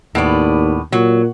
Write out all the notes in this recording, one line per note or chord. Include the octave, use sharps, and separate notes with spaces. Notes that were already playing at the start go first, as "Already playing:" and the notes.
D#2 A2 B3 D5
A#2 F#3